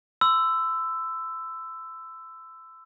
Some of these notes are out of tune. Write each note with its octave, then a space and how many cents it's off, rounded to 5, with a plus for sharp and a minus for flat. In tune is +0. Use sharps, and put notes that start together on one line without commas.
C6 -35 E6 +5